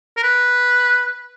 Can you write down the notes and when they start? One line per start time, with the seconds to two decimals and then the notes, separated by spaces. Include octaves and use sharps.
0.17 A#4
0.23 B4